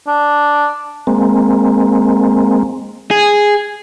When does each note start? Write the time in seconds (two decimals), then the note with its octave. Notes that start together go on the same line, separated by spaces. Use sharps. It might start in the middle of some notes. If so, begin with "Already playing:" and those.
0.07 D4
1.07 G#3 A#3 C4
3.11 G#4